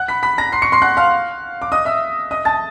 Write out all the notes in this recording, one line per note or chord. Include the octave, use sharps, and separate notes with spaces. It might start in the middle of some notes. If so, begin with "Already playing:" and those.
Already playing: F#5 F#6
B5 B6
B5 B6
A#5 A#6
C6 C7
C#6 C#7
C6 C7
F#5 F#6
F5 F6
D6
D#5 D#6
E5 E6
D#5 D#6
A5 A6